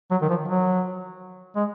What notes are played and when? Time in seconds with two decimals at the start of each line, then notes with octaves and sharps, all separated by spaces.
0.11 F#3
0.22 D#3
0.30 F3
0.48 F#3
1.56 G#3